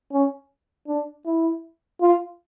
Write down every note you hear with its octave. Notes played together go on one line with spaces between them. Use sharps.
C#4
D4
E4
F4